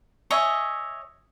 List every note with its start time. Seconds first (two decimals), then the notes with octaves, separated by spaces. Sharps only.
0.31 C#5 D#5 E5 G#5